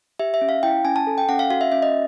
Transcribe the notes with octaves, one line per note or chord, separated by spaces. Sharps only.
G4 E5
E5
C#4
F5
E4 G5
C#4 G#5
A5
A4
G5
C#4 F#5
F5
F#4 F5
E5
C#4 E5
D#5